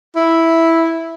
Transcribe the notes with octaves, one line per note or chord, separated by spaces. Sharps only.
E4